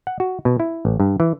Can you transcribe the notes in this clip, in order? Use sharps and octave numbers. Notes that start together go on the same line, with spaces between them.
F#5
F#4
B2
E4
A1
G2
E3